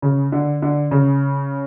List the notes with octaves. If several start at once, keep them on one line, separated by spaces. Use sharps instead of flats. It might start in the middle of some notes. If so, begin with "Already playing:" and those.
C#3
D3
D3
C#3